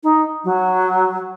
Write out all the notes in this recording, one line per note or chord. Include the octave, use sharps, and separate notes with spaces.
D#4
F#3